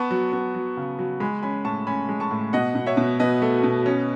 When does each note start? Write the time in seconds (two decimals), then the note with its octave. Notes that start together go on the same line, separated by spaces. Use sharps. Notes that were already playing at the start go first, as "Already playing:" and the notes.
Already playing: B3 A5 C#6
0.11 F#3
0.33 B3
0.55 F#3
0.77 C#3
0.99 F#3
1.20 G#3 G#5 B5
1.42 C#4 G#5 B5
1.65 A2 A5 C#6
1.87 C#4 G#5 B5
2.09 G#3
2.20 A5 C#6
2.31 A2
2.53 B2 D#5 F#5
2.75 B2
2.86 C#5 E5
2.97 B2
3.20 B2 B4 D#5
3.42 A3
3.63 B2
3.86 C#4